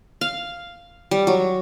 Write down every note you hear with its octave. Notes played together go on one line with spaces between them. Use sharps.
F5
G3
F#3